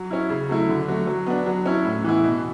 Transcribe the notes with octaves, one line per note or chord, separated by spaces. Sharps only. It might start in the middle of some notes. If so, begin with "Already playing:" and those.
Already playing: F#3
C#4 E4
C#3
F#3 A3 E4
D3
F#3 A3
F#3
B3 D4
F#3
C#4 E4
A2
E3 B3 E4
B2